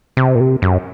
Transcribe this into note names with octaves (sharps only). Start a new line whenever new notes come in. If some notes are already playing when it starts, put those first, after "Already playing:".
C3
A#2
C3
F#2